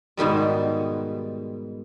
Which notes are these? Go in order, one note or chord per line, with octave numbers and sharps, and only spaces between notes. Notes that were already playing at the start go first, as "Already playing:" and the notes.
G#2 B2 D#3 G3